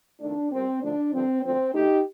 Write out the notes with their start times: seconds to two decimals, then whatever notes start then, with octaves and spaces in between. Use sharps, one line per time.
0.21 F2 D#3 A3 D4
0.52 A#2 G3 A#3 C4
0.82 D2 D3 F3 A3 D4
1.13 G2 D3 F3 C4
1.43 D2 D3 F3 C4
1.73 D2 D3 A3 D#4 G4